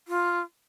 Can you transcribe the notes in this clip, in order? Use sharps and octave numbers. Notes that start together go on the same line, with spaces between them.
F4